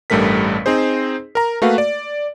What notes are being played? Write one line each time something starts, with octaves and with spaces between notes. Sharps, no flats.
A1 G2 G3 A3 A#4 B6
C4 D#4 G#4 C5
A#4 A#5
A3 A#3 F#4 B4 F5
D5